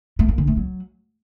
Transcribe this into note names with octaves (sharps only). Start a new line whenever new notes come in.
A3
A#3
D3
A3
F#3